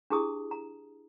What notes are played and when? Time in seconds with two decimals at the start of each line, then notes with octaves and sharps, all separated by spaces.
0.10 D4 E4 G4 G#4 A5 D#6
0.51 A#5